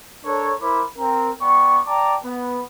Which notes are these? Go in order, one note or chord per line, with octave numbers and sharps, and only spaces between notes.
D4 A4 A#4 C#5
E4 A#4 C5 B5 D6
C4 A#4
B3 D5 G5 C#6
D5 G5 A5 A#5 D6
B3